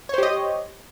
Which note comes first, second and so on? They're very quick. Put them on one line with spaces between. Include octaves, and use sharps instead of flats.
C#5 C5 G4 D#5